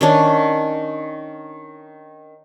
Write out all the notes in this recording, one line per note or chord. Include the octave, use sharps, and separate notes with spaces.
D#3 C#4 D4